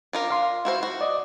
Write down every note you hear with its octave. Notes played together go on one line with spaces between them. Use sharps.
D4 F4 A#4
F5 C6
E4 F#4 C5
F#4
D5 D#5